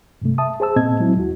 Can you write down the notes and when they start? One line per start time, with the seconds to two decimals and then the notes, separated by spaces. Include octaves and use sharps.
0.22 G2 C3 A3
0.38 E5 A5 D#6
0.60 G#4 C5 A5 E6
0.76 A#2 B3 C4 D#5 A5 G#6
1.00 F#3 G#3 C4 E4
1.17 D#2 F#4